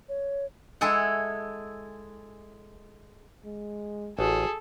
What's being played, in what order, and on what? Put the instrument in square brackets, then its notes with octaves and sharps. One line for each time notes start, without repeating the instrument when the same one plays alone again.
[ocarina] C#5
[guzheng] G#3 E4 G#4 A4 F#5
[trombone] G#3
[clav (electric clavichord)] A1 [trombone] F#4 [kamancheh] G#4 [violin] A4